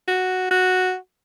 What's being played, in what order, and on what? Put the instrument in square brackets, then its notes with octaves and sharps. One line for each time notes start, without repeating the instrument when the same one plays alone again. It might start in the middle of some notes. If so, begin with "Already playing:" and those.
[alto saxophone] F#4
F#4